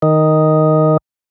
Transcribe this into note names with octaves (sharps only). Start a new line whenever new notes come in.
D#3